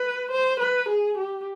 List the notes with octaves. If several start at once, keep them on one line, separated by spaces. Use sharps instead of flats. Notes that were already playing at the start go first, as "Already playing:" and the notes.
Already playing: B4
C5
B4
G#4
G4